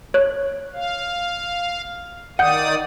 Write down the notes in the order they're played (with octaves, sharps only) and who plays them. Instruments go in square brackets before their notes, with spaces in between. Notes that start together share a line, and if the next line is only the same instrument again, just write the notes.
[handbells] C#5 F#6
[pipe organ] F5
[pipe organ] D#3 D5 D#6 [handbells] F#5 G5 G6